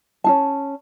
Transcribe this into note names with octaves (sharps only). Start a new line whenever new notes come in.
C#4 D#4 A5